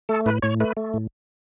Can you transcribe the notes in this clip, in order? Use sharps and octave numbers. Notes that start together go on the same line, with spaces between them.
A3 A4
A2 B4
A2 C#5
A3 B4
A3
A2